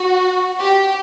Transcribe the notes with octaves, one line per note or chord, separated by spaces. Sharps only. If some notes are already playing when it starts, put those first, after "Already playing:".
Already playing: F#4
G4